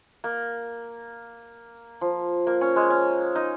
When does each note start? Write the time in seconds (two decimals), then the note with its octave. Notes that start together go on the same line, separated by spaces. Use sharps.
0.24 A#3
2.01 F3
2.47 A#3
2.61 C#4
2.76 G#3
2.90 C#4
3.35 D#4